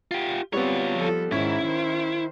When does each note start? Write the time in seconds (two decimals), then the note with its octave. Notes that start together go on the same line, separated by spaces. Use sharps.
0.11 F4 G4
0.53 G3 B3 C4 F4 F#4 C#5
0.94 F3 A4
1.32 G#2 D#3 C#4 E4
1.65 D#3 C5